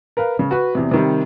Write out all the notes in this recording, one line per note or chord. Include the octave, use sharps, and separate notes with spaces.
A#4 B4 F5
C#3
F#4 B4
E2 C3
C3 D#3 G3